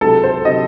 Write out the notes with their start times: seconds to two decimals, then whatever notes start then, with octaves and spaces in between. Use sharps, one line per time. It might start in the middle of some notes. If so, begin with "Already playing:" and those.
0.01 C#2 C3 F#3 A4
0.24 C5
0.45 C3 F#3 D#5